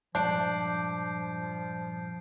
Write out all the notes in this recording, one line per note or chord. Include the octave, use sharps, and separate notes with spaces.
G2 A#2 F3 G#3 D4 G6 C7 D7